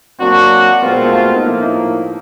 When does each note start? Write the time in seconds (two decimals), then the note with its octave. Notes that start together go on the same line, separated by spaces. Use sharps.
0.19 F#3 A#3 C4 D4 F#4
0.82 B2 G#3 B3 C4 F4
0.92 A#3
1.04 A3
1.13 A#3
1.25 B3
1.36 D#4
1.46 A2 F3 A#3 E4
1.62 D#4